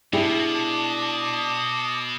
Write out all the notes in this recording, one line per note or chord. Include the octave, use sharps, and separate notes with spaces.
B2 D4 E4 G4 G#4 A5 D6 D#6